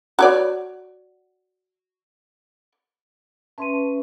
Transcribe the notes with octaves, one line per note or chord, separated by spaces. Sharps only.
F#4 C#5 D5
C#4 B4 E5 A5 C6 D#7